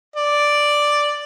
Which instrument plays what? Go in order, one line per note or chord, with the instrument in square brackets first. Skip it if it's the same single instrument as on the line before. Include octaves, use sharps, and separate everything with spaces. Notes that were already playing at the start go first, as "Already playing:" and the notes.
[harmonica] D5